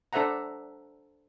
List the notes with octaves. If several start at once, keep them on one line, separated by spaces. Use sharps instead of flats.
D4 A4 C5 E5 F#5 A#5